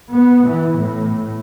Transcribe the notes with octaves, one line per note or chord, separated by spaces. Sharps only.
B3
E3
A2